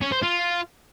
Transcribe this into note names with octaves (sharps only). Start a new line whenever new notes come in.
C#4
C5
F4